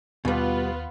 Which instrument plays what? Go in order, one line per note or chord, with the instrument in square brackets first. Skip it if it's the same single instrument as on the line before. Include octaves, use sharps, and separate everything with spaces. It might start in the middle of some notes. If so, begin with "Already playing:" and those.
[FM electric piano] D#2 [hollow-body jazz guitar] B2 G3 [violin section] B3 F4 B4